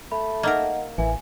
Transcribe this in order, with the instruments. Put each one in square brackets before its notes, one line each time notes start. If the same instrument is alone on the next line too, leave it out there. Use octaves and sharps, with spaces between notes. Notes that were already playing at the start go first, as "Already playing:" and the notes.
[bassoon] A3 [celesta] B5
[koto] A#3 D#4 A#4 [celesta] D#5 F#5
[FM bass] A1 [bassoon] E3 [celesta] G#5